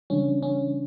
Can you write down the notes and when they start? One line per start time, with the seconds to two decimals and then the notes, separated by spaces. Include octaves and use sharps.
0.10 C#3 E3 G3 C#4 D4
0.43 C#4